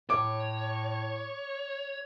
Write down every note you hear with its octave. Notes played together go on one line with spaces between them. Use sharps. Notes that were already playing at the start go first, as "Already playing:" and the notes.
A2 C#5 D6